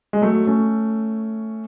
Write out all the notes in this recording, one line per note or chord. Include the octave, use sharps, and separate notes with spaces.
G#3
F#3 A3
A3 C#4